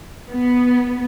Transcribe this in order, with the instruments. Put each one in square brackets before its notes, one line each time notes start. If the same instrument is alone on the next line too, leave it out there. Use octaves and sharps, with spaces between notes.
[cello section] B3